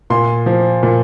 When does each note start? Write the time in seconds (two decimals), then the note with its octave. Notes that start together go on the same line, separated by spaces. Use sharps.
0.10 A#2 C6
0.46 F3
0.83 A#2